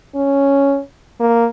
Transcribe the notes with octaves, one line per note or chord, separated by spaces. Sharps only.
C#4
A#3